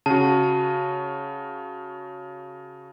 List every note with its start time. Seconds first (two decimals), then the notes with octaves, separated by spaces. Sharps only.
0.06 C#3 F#4 A5